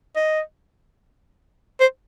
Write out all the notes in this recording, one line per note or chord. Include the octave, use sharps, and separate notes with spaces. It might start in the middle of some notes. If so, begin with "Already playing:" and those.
D#5
C5